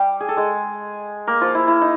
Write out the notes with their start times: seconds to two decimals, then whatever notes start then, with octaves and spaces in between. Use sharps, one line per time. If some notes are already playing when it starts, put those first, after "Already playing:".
Already playing: G3 G4
0.20 G#4
0.29 A4
0.37 G#3 G#4
1.27 A#3 A#4
1.41 F3 F4
1.55 E4
1.68 E4
1.82 D#4